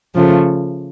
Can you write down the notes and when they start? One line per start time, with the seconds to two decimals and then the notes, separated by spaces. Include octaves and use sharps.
0.15 C#3 F3 A3